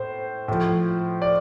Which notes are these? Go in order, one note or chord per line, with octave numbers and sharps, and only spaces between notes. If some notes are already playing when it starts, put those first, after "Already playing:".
Already playing: A2 C5
A2 F3
D5